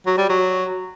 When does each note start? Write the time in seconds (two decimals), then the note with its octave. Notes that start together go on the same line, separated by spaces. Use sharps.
0.06 F#3
0.18 G3
0.29 F#3